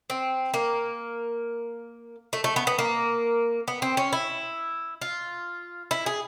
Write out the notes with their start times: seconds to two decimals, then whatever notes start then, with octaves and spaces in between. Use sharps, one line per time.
0.10 C4
0.54 A#3
2.33 A3
2.44 A3
2.56 B3
2.67 B3
2.79 A#3
3.68 B3
3.82 C4
3.97 C#4
4.13 E4
5.01 F4
5.91 E4
6.06 G#4